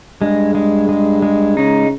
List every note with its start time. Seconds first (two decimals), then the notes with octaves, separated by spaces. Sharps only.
0.21 G2 G#3
0.55 G#3
0.89 G#3
1.22 G#3
1.57 C#3 D#4